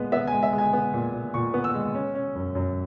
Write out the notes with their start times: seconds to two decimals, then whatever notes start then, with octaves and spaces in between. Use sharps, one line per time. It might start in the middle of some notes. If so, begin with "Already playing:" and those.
Already playing: A#2 G#3 B3
0.12 B3 E5
0.27 G#3 G#5
0.43 E5
0.53 G#3
0.58 G#5
0.73 B3
0.93 A#2
1.13 A#2
1.34 A#2 C#6
1.54 B3
1.64 E6
1.74 G#3
1.95 C#4
2.15 C#4
2.35 F#2
2.55 F#2